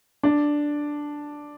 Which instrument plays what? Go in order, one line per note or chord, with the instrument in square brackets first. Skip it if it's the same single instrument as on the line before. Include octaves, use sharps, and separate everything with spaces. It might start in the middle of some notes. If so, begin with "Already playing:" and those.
[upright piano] D4